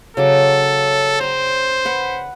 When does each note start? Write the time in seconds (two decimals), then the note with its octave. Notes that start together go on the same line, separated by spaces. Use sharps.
0.17 C#3 F#3 A4 D6
1.21 C5 G5 A#5
1.85 B4 F#5